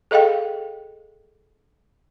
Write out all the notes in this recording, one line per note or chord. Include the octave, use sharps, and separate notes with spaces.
G#4 A4 D#5 F5 G5